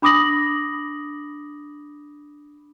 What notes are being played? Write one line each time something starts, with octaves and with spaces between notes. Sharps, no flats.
D4 B5 D6 D#6 A#6 F#7